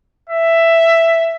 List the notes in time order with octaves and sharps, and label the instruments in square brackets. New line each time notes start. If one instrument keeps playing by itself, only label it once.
[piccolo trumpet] E5